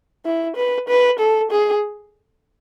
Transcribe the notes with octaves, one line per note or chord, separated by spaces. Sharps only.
E4
B4
B4
A4
G#4